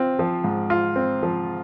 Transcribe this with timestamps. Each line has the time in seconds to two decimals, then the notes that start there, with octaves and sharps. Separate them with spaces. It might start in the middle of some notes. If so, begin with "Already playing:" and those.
Already playing: C4 F4
0.19 F3
0.44 G#2
0.70 F4
0.96 C4
1.23 F3